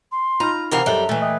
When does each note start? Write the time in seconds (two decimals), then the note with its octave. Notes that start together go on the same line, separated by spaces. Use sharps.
0.11 C6
0.40 D#4 F4 A#5 B5 F6
0.71 C3 E3 A#4 C5 F5 F#5 A#5
0.86 F#2 G3 C4 A4 D#5 E5 F#6
1.09 A#2 E3 A3
1.21 D#5 E5 G5 D#6